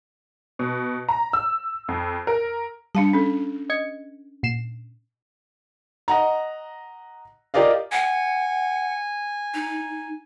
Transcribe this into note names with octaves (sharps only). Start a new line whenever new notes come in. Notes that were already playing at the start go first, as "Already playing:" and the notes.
B2
A#5
E6
F2
A#4
G3 D4 F5 A5
C#4 A4
D#5 G#6 C#7
A#2 C7 E7
D#5 F#5 A#5
F4 G4 A#4 D5 D#5 F5
F#5 G#5
D#4